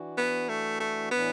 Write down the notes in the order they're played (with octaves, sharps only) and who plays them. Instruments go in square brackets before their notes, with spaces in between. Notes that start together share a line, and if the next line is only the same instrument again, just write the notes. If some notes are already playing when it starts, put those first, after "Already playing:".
Already playing: [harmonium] E3 D4 F#4
[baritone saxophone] B3
A3
A3
[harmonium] A2 E3 D4 [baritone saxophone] B3